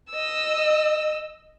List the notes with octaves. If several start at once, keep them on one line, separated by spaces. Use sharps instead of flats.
D#5 E6